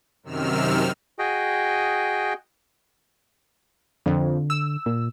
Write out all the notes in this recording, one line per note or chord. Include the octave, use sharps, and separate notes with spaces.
F#2 C3 D#3 E6 F6
F#4 G#4 D#5 G5
F2 D3
E6
A#2